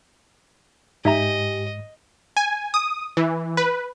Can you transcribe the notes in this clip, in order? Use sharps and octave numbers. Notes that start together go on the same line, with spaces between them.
G#2 D#4 G4 D#5 E5 G#5 A#5
G#5
D#6
E3
B4